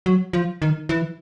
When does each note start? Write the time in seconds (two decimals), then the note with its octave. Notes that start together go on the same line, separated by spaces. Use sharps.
0.06 F#3
0.33 F3
0.62 D#3
0.89 E3